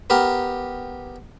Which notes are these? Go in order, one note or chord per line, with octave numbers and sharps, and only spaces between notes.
B3 G4 A#4